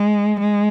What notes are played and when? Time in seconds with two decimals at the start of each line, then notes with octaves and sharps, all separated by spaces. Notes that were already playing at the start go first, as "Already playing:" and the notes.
Already playing: G#3
0.40 G#3